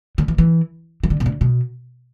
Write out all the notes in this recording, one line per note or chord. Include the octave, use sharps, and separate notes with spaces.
D3
E3
E3
E3
D3
B2
D3
B2